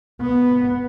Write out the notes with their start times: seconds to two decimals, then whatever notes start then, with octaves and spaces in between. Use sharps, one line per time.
0.22 B3